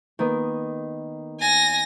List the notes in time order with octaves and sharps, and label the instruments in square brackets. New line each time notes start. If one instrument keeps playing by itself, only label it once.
[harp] D#3 A#3 B3
[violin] G#5 A#6